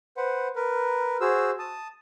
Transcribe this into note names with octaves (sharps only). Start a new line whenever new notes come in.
B4 C5 F#5
A#4 B4
F#4 G#4 C5 E6
A5 D#6